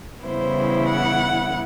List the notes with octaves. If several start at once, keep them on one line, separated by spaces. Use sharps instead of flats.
C#3 E3 G3 B3 E4 C5
F#5